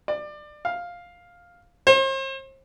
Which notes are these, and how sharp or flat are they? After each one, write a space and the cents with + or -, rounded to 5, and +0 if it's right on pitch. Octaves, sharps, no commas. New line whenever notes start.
D5 +25
F5 +5
C5 +40